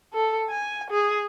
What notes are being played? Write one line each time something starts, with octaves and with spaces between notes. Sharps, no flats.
A4
G#5
G#4